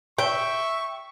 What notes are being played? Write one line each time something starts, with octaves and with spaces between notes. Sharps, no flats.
E5 G5 C#6